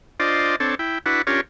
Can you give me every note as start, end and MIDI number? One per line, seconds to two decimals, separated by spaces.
0.20 0.56 62
0.20 0.56 65
0.20 0.56 72
0.20 0.56 74
0.20 0.56 75
0.60 0.75 60
0.60 0.75 62
0.60 0.75 69
0.60 0.75 73
0.79 0.98 64
0.79 0.98 79
1.06 1.22 62
1.06 1.22 64
1.06 1.22 66
1.06 1.22 71
1.06 1.22 78
1.27 1.41 61
1.27 1.41 62
1.27 1.41 65
1.27 1.41 67
1.27 1.41 70
1.27 1.41 73